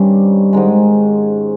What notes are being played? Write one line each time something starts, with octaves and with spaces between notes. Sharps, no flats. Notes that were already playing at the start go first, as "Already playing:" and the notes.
Already playing: G2 D#3 G3 C4 C#4
G#2 D#3 G#3